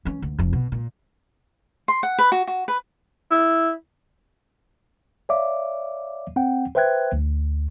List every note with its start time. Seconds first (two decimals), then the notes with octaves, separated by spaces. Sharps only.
0.05 E3 C#4
0.22 D2
0.39 F1 F3
0.53 B2
0.72 A#2
1.88 C6
2.03 F#5
2.19 B4
2.32 F#4
2.47 F#4
2.68 B4
3.31 E4
5.29 C#5 D5 E5 F5 D6
6.36 C4 F#5 G5
6.75 B4 C5 E5 G5 F#6 G#6
7.13 D2